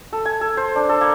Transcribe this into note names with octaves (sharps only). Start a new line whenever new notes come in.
A4
G#5
A4
C5
D4
A4
A#3